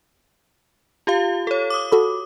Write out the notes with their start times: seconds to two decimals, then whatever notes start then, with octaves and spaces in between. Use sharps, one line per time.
1.07 F4 G4 F5
1.47 A4 C#5
1.70 D6 D#6
1.92 F#4 A4 B5